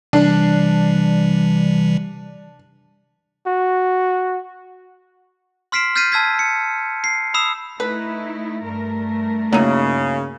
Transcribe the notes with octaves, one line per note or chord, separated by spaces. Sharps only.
C3 E3 G3 D4
F#4
C6 F6 B6 C7 D7 E7
F6 G6 A6 B6 C7 D#7
A5 E6 G#6 B6
C#7
C7
B5 D#6 E6 C7 E7
A3 D#4 E4 B4
G2 A3 A#4
C#3 F#3 A#3 D#4 E4